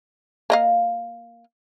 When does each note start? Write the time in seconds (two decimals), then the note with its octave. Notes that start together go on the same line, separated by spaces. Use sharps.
0.50 A#3 D#5 F5